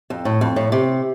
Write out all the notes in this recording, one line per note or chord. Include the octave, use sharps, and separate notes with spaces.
F2
A2
F2
A2
C3